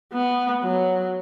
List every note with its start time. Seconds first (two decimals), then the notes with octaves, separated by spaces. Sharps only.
0.13 B3
0.64 F#3